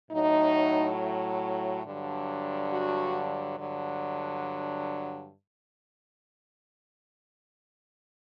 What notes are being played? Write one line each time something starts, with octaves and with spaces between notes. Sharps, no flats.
A2 F#3 D#4
G2 D3 F#3
F#4
G2 D3 F#3